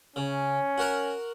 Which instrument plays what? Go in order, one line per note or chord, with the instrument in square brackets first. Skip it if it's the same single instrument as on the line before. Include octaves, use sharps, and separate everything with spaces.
[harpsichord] C#3 [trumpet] C#4
[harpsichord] F#4 A#4 F#5